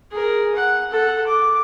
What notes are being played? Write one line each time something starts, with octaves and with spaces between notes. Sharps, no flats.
G#4 A#4
F#5
A4 F#5
D6